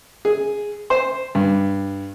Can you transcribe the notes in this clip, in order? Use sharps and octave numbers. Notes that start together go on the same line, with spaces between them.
G#4
C5
G2